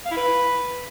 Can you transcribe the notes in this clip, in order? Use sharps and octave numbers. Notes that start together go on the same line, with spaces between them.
F5
E4
B4